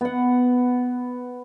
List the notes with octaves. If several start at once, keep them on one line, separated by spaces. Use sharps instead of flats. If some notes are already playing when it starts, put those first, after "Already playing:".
B3 F#5